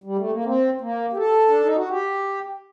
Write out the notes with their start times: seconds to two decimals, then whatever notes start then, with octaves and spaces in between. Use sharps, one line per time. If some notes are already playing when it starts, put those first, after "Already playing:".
0.04 G3
0.18 A3
0.31 A#3
0.44 C4
0.81 A#3
1.13 G4
1.17 A4
1.48 D4
1.62 D#4
1.75 F#4
1.89 G4